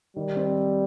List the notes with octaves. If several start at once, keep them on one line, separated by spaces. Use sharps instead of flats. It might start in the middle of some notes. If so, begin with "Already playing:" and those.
D#3 G3
C4